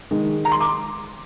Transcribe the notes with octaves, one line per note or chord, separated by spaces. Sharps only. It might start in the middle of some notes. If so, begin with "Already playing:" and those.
D#3 G#3 D#4
A#5
C6
D6